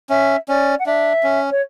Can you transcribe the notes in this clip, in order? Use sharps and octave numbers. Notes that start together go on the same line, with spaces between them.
C#4 E5
C#4 D5
F#5
D4 E5
C#4
C#5